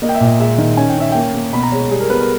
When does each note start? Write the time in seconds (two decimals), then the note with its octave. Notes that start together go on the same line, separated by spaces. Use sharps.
0.02 A#3 D#5
0.09 G5
0.15 E5
0.20 A#2
0.27 D#5
0.39 G#3 E5
0.58 D#3
0.77 C#4 G#5
0.89 G5
0.97 C#4 E5
1.12 A#3 G5
1.34 A#3
1.53 B2 B5
1.63 A#5
1.72 G#3 C#5
1.91 G3 G#4
2.00 A#4
2.10 B3 B4
2.20 A#4